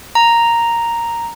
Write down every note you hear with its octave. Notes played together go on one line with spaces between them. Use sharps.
A#5